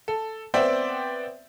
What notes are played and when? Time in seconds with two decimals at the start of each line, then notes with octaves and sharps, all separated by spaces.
0.08 A4
0.54 B3 C4 C5 D5 E5 G5